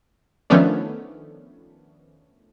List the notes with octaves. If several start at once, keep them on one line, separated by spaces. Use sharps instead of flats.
D#3 F3 A3 B3 C#4 D4